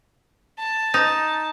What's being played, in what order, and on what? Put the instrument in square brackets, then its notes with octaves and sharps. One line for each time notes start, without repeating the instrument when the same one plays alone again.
[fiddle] A5
[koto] D#4